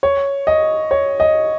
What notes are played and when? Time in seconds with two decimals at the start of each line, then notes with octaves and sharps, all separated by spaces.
0.03 C#5
0.47 D#5
0.91 C#5
1.20 D#5